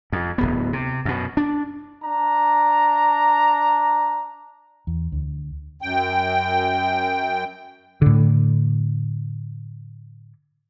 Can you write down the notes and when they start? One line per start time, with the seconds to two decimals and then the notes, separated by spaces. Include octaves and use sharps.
0.12 F2
0.38 D1 G#1 B3
0.73 C3
1.05 F#2 B2
1.37 D4
2.03 D4 A#5
4.87 E2
5.12 D2
5.82 F#2 G5
8.02 A2 D3